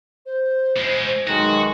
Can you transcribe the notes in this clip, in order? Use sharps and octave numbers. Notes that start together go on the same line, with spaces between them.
C5
B2 G#3
B1 D#3 G#3 F#4